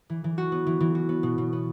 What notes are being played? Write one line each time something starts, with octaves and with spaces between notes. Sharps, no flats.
E3
E3
F#4
B3
E3
E3
F#4
B3
B2
B2
B3